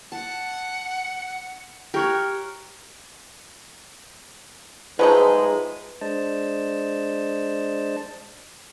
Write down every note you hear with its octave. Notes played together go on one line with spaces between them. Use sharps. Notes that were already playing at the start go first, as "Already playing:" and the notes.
F#5 A5
G4 A#4 C#5 G5 C#6 F#6
B1 G#2 F3 G#3 A3 D#4 B4
G#3 D4 C5 D#5 A5